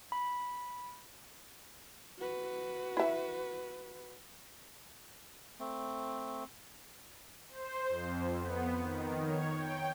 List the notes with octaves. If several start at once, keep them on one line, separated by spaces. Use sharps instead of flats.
B5
F#4 B4
E4 E5
A3 C4
C5
F2
B3
D#3
C#5
G5